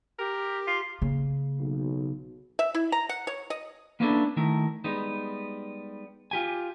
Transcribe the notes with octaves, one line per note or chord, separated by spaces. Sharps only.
G4 A#4
F4
C#3 A#3
B1
E5
E4
A#5
F#5
C#5
D#5
A#3 B3 C#4 D4 E4 A4
D#3 A3 E4 A#4
G3 G#3 B3 D#4
F4 G4 G#5